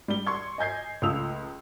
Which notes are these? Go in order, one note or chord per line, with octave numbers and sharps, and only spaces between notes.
G3 G7
C6 C#6 G#6
D#5 G#5 G6 G#6 C7
C#2 A3 F4 D#6 E6 F7